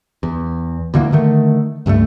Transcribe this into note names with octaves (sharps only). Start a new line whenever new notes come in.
E2
D2 D3 E3 A#3
D3 D#3 A3
C#2 G2 G#3 A3